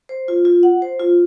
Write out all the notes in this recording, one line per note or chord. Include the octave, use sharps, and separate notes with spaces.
C5
F4
F4
F#5
C5
F4